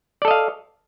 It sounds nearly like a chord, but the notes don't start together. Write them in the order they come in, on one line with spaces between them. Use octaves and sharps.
D5 A4 D#5 F5